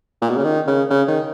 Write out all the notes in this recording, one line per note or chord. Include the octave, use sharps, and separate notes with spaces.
A#2
B2
C#3
D#3
C#3
C#3
D#3